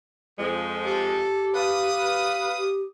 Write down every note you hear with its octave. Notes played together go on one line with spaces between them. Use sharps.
F2 G#3
G4 A4
B4 F5 D#6
G4